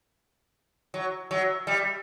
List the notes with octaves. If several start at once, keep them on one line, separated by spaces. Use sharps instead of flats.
F#3
F#3
G3